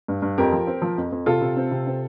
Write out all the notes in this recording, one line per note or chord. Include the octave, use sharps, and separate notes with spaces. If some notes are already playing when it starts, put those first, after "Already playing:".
G2
G2
F2 G4 A#4
F3
C4
F3
F2
F2
C3 F4 A4
C3
C4
C3
C4